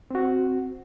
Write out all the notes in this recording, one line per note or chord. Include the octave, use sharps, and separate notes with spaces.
C4 F#4